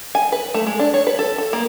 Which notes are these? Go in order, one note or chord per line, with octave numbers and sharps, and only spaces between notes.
G#5
B4
A3
G#3
D4
C#5
B4
A4
A4
A#3